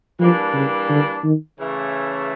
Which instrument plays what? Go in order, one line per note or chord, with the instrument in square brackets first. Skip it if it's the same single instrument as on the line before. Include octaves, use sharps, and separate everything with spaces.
[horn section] E3 G3 A#3 D4 [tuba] F3
[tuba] C#3
D3
D#3
[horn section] C#3 E3 A3